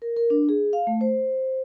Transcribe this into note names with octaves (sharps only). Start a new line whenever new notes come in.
A#4
A#4
D4
G#4
F5
A3
C5